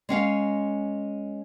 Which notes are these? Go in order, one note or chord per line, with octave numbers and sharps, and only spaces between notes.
G#3 C#4 F5